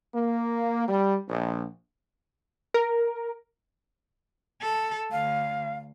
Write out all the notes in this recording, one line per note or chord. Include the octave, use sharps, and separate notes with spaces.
A#3
G3
A#1
A#4
A4
D2 F5